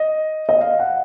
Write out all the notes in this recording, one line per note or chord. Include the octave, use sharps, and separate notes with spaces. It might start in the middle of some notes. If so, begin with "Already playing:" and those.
Already playing: D#5
D#5
F5
F#5